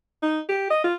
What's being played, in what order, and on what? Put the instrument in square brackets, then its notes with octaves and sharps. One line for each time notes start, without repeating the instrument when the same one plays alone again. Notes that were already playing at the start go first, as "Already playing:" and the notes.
[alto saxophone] D#4
G4
D#5
F4